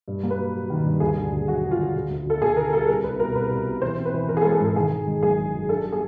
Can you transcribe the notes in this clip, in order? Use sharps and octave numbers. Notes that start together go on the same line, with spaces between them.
G2
A#3
B4
F#3
F#3
D#3
G2
D2 G#4
D3
D2
F#3 F#4
D2
F4
D3
D2
D2
D2 A4
D2 G#4
D3 A#4
G3 A4
C2 A#4
C2 B4
B2 A#4
C2 B4
C2
B2
E3 C5
C4
B4
E3
E3 A#4
G#4
A4
G#3
G#4
G#2 A4
D#3 G#4
D#3
G#3
F#1 G#4
F#1
F#2
D4 A4
G3
G#4